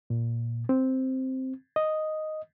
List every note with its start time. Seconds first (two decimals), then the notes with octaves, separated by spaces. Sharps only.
0.10 A#2
0.69 C4
1.76 D#5